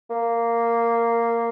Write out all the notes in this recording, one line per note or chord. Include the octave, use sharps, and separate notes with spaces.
A#3